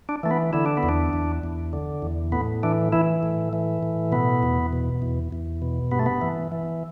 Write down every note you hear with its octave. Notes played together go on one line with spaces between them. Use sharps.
D4
E3 A3
B3
D3 E4
D4
B3
E2
D4
E2
E2
D3
E2
A2 B3
E3 D4
E3 E4
A2
E3
A2
B2 B3
E2
B2
E2
E2
B2
G2 B3
A3
B3
E3
E3